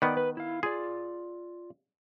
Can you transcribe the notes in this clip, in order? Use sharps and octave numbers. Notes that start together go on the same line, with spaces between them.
D#3 B3 D5
B4
E4 F5
F4 G#4 D5